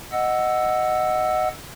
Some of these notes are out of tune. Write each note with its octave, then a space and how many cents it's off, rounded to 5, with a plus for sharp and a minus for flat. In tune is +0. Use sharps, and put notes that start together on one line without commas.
D#5 +0 F#5 +0 E6 +0